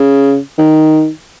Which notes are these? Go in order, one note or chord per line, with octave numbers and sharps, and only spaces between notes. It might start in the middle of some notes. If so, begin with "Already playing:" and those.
Already playing: C#3
D#3